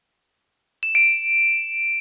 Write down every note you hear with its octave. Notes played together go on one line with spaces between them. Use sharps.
E7
D7